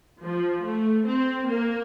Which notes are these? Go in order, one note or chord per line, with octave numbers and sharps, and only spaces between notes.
F3
A3
C4
A#3